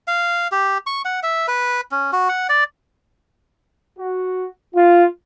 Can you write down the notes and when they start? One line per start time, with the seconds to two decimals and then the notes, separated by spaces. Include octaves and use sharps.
0.08 F5
0.52 G4
0.87 C#6
1.05 F#5
1.23 E5
1.48 B4
1.92 C#4
2.13 F#4
2.29 F#5
2.49 D5
3.99 F#4
4.75 F4